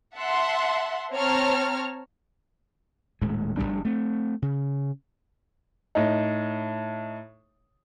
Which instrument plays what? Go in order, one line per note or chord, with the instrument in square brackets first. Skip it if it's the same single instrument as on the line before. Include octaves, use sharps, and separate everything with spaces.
[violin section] E5 F#5 A5 C6
C4 C#5 A5 A#5 F6
[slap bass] D#1 A2 G#3
F1 E2 G3 D4
A3 C4
C#3
[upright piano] A2 D#4